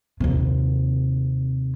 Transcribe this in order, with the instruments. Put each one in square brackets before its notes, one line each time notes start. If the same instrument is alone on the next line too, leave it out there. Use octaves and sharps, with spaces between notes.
[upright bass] D#2 C3